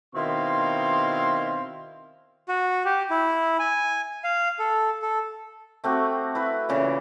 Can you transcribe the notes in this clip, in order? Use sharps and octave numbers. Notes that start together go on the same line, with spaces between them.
B2 D#3 C4 E4 F5 C6
F#4
G4
E4
G#5
F5
A4
A4
A3 C4 F#4 G4
E4 B4
A#2 C#3 E3